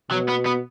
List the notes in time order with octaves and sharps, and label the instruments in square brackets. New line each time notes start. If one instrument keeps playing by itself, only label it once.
[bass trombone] B2 [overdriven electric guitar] F#3
[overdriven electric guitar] B3
B3